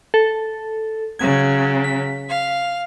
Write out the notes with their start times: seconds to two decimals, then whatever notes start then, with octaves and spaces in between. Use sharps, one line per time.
0.14 A4
1.19 C#3 F#3 G#6
1.84 B6
2.29 F5